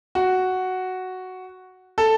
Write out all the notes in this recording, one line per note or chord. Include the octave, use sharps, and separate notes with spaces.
F#4
A4